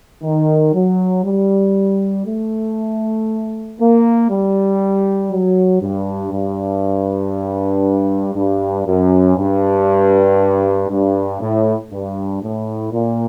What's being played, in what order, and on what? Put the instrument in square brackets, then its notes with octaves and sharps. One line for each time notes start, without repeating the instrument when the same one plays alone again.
[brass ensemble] D#3
F#3
G3
A3
A#3
G3
F#3
G2
G2
G2
F#2
G2
G2
A2
G2
A2
A#2